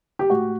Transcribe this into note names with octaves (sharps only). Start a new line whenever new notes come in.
G4
A2 F#4